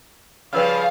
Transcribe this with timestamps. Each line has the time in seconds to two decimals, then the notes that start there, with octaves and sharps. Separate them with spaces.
0.53 C#3 F3 G3 B4 F5 E6 F6